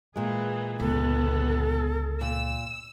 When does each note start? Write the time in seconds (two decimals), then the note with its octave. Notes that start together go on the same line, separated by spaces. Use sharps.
0.16 A#2 E3 G#3 G#4
0.80 G1 C#2 B3 A4
2.21 A#2 E6